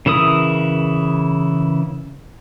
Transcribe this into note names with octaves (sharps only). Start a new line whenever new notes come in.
C#3 E3 E4 A#4 D#6